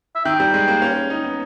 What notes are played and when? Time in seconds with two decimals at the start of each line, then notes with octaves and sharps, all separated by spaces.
0.15 E5
0.25 D#3 G5
0.40 G3
0.54 G#3
0.68 A#3
0.82 C#4
1.10 D#4
1.24 B3